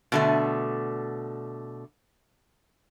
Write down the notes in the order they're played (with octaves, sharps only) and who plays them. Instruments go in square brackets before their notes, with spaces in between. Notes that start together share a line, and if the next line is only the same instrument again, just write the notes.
[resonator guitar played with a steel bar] B2 D3 A3